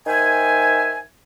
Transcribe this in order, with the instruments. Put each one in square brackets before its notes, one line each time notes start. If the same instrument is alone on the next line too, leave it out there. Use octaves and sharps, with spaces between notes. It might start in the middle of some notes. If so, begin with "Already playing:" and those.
[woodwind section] D#3 C5 E5 G#5